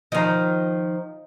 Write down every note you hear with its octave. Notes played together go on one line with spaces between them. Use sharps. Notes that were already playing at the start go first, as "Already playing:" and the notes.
D#3 F3 D#5 F5 A#5